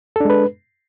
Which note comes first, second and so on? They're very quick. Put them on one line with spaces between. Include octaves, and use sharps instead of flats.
A4 D4 G#3 B4